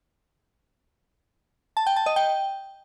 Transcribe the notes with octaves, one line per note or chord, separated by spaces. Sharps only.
A5
G5
A5
D#5
G5